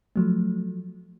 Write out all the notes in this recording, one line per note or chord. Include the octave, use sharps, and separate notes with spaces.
F3 F#3 A3